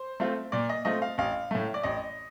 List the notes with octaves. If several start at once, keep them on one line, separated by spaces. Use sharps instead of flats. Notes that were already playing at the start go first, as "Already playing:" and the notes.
Already playing: C5
A3 C4 F4
A#2 D5
D#5
A3 C4 F4 D#5
F5
A1 F5
A2 A3
D5
A1 D#5